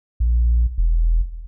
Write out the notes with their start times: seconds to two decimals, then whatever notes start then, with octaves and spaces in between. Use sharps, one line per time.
0.20 A#1
0.78 E1